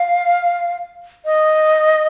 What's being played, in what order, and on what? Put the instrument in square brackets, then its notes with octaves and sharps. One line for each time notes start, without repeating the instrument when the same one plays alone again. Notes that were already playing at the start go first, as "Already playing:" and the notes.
Already playing: [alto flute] F5
D#5